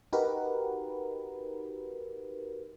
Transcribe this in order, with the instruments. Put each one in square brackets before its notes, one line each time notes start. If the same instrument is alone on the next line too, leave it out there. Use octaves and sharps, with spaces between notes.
[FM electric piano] D#4 F#4 G4 A#4 B4